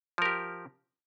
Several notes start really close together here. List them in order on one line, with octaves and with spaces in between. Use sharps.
F3 A#4 G4